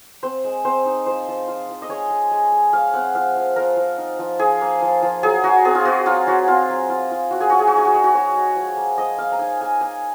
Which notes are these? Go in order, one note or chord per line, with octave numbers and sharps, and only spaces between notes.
C4 C5
G#3
C4 C5
D#4
F3 C5
F3
F4
F3
D#5
G#3 C#5
G#3
G#3
G#3
F3 F5
C4 F#5
F3 F5
F3
F3 A#4
F3
D#4
F3
F3 G#4
A#3
F3
F3
F#3 G#4
F#3 F#4
C4 G#4
F4
C4 F#4
F#3 F4
F#3 F#4
C4 F4
F#3
F4
F4
F4 F#4
G#4
C#4 F#4
G#4
F#4
D#4 G#4
F#4
G#3 G#4
F#4
G#3 C#5
G#3
F3
A#3
F3 D#5
A#3 F5
A#5
D#4 G#5
A#3 G#5
A#3 G#5